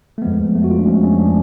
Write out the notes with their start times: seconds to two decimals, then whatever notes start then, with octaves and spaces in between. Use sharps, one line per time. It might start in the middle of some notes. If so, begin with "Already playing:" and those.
0.18 A3
0.22 F2 F3 G#3 B3
0.55 A3
0.64 F#4
0.71 F4
0.79 D4
0.87 F2 F3 G#3 C#4
1.04 C#4
1.19 D4